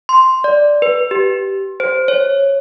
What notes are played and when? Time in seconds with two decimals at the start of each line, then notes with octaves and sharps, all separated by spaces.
0.09 C6
0.44 D5
0.82 B4
1.11 G4
1.80 C5
2.08 C#5